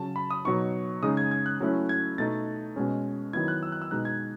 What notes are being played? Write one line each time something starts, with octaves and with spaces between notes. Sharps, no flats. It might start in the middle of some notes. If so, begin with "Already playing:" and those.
Already playing: C#3 F#3 C#4 A5
B5
D#6
B2 F#3 B3 D#4 C#6
C#3 G#3 D#4 D#6
G#6
G#6
F#6
F#3 A3 C#4 E4
G#6
B2 A3 D#4 A6
B2 G#3 C#4
D#3 F#3 B3 E4 G#6
F#6
E6
F#6
E6
B2 G#3 D#4 F#6
G#6